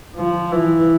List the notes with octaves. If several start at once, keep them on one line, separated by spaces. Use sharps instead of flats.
F3
E3